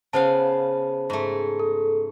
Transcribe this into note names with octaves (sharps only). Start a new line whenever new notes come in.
C#3 B3 C5 F5 A5
G#2 A3
A4